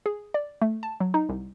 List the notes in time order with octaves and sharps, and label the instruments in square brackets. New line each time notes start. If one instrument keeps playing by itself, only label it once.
[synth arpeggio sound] G#4
D5
A3
A5
F#3
D#4
C2